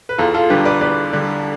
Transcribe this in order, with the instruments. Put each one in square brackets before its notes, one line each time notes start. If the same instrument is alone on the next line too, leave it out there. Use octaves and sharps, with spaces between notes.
[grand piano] B4
[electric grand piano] E2 [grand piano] F4 A4
[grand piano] F4 A4
[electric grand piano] D3 G3 D4 [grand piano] G4 B4
[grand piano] B4 D5
[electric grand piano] E2 [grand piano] B4 D5
[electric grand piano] D3 G3 D4